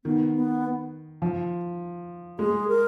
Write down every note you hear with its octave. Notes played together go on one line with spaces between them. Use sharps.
D#3 B3
B3
F3
G#3 G#4
A#4